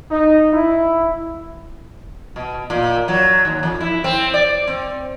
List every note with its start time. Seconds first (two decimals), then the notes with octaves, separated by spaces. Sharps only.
0.11 D#4
0.53 E4
2.36 B2
2.70 A#2
3.08 F#3
3.45 D#2
3.63 F2
3.80 E4
4.04 C4
4.34 D5
4.68 C4